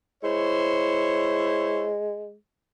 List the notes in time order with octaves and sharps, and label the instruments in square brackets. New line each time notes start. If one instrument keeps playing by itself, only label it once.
[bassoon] G#3 [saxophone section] E4 C5 C#5